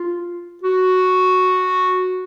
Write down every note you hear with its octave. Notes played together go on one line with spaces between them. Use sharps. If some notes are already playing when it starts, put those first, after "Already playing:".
Already playing: F4
F#4